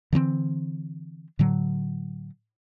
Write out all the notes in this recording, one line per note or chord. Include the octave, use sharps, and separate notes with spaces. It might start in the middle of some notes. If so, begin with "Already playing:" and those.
D3 E3 B3 C4
A2 D3 F#3